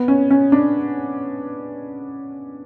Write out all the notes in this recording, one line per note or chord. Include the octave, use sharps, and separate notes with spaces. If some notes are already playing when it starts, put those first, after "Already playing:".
Already playing: B3
C#4
C#4
D4